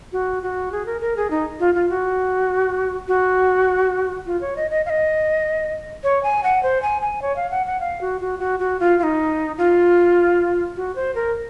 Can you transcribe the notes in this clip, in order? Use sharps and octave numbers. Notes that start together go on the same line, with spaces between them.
F#4
F#4
G#4
A#4
A#4
G#4
D#4
F4
F4
F#4
F#4
F4
C#5
D#5
D#5
F5
D#5
C#5
G#5
F#5
C5
G#5
G#5
C#5
F5
F#5
F#5
F5
F#4
F#4
F#4
F#4
F4
F4
D#4
F4
F#4
C5
A#4